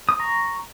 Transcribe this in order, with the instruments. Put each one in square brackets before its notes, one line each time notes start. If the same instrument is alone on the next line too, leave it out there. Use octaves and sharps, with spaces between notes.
[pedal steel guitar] D#6
A#5 C#6